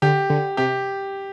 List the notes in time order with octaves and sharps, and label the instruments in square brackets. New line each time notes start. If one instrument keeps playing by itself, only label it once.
[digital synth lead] D3 [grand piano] G4
[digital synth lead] D3
[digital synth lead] C3 [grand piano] G4